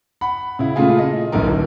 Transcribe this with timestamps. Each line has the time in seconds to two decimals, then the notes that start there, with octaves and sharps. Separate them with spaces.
0.21 F#5 B5
0.59 C#3 E4
0.76 A#2 C#3 G#3 A3 F4 G#4
0.99 D#5
1.32 D1 B1 F#2 D3 D#4 A#4
1.48 D1